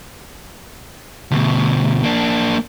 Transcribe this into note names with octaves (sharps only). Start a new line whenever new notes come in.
D2 B2
A#3 D4